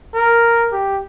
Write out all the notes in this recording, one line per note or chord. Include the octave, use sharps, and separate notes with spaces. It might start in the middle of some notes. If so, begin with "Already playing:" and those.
A#4
G4